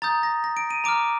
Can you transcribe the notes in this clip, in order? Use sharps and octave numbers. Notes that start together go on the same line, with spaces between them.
A#5 D#6 G6 A6
A#6
A#6
D7
D#7
A#5 D6 F6 D7